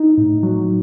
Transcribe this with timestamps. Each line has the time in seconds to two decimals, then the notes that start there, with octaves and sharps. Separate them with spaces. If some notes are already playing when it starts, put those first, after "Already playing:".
Already playing: D#4
0.18 A2
0.43 F#3